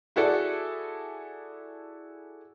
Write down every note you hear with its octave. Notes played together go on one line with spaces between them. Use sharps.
E4 F#4 G#4 A4 D5